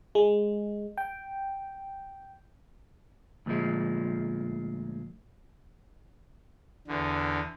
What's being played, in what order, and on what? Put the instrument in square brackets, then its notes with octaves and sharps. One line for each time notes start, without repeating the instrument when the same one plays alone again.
[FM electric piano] G#3
G5
[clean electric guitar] D2 A#2 E3 F3 G#3
[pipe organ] E2 D3